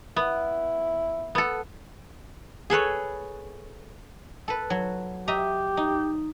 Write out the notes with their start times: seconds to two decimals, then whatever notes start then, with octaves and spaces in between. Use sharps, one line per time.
0.16 B3 E4
1.35 B3 A4
2.70 G#4 A4 B4 C#5
4.48 A4 B4
4.70 F#3
5.28 G4 D#5 E5 A#5
5.77 D#4